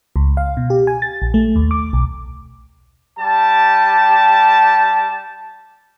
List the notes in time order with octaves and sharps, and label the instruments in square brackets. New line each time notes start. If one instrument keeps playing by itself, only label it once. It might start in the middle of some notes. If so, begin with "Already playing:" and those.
[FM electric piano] C#2
F5
B2
G4
G#5
A6
A#1
A3
D#2
D6
B1
[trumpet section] G3 G4 A5